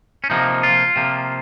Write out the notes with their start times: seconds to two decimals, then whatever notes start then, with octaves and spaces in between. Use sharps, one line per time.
0.24 C#4
0.30 C3 F3 A#3 D#4
0.63 F4
0.96 C3 F3 A#3